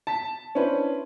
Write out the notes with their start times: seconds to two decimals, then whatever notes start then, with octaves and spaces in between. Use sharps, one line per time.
0.07 A5 B6
0.55 C#4 D4 E4 B4 C5